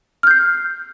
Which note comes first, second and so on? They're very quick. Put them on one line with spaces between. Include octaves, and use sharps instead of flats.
F6 G6 C7